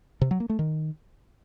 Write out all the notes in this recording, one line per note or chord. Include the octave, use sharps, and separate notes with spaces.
C3
F#3
A#3
A3
D#3